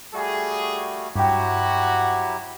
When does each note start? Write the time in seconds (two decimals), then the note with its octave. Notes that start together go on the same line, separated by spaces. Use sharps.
0.14 G3 A3 F#4 G#4
1.16 G2 F#3 E4 F#4 G4 G5